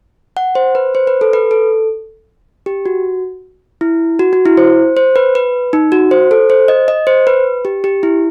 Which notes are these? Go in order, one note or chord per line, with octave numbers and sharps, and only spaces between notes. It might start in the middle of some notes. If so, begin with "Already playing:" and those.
F#5
C5
B4
C5
B4
A4
B4
A4
G4
F#4
E4
F#4
F#4
E4
C5
C5
B4
B4
D#4
F#4
C5
A4
C5
D#5
D#5
C5
B4
G4
G4
E4